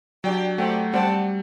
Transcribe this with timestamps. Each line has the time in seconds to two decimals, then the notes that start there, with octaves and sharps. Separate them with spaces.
0.24 F#3 D4 G4 D5 G5
0.58 A3 C4 G4 D5 F#5
0.93 G3 C4 G4 D5 F#5 A5